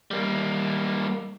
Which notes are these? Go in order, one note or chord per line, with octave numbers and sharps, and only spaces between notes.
G3 A#3